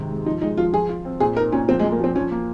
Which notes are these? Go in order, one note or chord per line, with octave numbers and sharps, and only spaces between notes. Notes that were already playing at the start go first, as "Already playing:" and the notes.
Already playing: G#2 C3 D#3
G#3
F3 D#4
G#3 D#4
F3 F4
F3 G#4
F4
C4
A#2 G#4
D#4 A#4
A#2 C#4
F3 C4
G#3
F3
A#3
F3 C4
F3 C#4
A#3